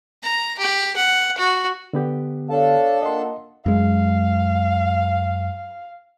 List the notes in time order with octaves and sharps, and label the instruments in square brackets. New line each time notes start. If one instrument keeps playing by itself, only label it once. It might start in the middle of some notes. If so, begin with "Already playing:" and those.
[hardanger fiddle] A#5
G4
F#5
F#4
[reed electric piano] D3 B3 G4
[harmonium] D4 A4 A5 [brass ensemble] C#5 F5
[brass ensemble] A#3 F4 F#5 [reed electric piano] D#5 C6
[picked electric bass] F#2 G#3 [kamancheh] F5